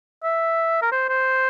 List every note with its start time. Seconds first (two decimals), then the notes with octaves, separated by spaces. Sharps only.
0.24 E5
0.82 A#4
0.92 C5
1.09 C5